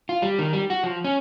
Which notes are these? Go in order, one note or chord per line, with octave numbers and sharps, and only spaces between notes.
F4
G3
D#3
G3
F#4
F3
C#4